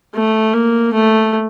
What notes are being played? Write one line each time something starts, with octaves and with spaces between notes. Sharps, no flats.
A3
A#3
A3